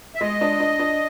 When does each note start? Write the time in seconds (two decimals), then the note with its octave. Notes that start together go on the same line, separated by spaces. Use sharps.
0.15 E5
0.21 G#3 D#5
0.41 D4
0.60 D4
0.79 D4